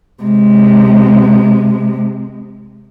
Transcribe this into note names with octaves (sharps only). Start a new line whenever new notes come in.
C3 G#3